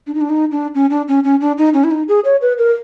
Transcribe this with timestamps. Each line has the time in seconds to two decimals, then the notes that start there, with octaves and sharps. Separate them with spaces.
0.07 D4
0.15 D#4
0.21 D4
0.30 D#4
0.52 D4
0.75 C#4
0.90 D4
1.08 C#4
1.24 C#4
1.41 D4
1.58 D#4
1.74 C#4
1.84 E4
1.91 D#4
2.08 G#4
2.25 C#5
2.42 B4
2.58 A#4